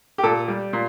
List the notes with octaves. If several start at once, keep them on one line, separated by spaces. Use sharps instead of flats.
G4
A#2 A4
G3
A#2